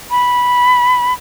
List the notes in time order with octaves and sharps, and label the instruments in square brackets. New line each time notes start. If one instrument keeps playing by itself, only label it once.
[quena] B5